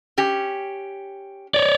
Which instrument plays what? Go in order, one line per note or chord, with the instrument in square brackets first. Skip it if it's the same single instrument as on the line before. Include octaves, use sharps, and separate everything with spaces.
[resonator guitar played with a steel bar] C#4 G4
[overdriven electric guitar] C#5 D5